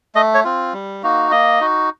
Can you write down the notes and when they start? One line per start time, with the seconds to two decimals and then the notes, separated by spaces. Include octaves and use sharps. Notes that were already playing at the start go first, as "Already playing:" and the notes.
0.15 A3 D#5
0.34 C#5
0.44 C4 F4
0.73 G3
1.03 A#3 D#4 F#4
1.31 A#3 D#5
1.61 D#4 F#4